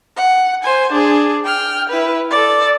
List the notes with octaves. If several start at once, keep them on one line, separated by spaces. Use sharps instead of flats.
F#5
C5 G#5
D4 G#4
G5 F6
E4 B4
A4 D5